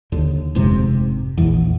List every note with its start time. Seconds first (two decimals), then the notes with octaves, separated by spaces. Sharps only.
0.12 D#2 D3
0.55 F1 G#2 C3
1.37 A#1 E2